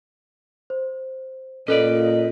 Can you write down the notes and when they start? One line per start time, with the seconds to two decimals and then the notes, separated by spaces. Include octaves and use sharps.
0.70 C5
1.68 A#2 C#4 A4 B4 D5 D#5